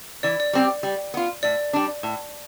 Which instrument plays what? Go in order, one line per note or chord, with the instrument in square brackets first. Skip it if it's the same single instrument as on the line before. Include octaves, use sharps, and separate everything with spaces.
[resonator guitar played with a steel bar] E3 [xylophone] D5
[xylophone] D5
[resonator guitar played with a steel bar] G3 C4 G4
G3
B3 F4
[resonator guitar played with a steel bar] A2 [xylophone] D5
[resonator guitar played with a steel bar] G3 D4
A2